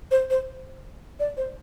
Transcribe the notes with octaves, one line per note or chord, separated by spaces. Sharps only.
C5
C5
D5
C5